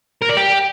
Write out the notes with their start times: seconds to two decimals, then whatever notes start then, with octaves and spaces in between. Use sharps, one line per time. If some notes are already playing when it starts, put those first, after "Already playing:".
0.22 A#4
0.29 D5
0.37 G4